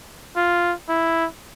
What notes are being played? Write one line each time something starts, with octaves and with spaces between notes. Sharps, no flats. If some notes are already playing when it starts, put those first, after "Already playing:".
F4
E4